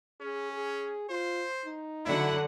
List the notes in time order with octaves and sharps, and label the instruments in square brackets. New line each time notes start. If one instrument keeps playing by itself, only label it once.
[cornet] C#4 [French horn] G#4
[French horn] G#4
[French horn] F4 [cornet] C5
[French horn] D#4
[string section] D3 F#3 F#5 [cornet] E4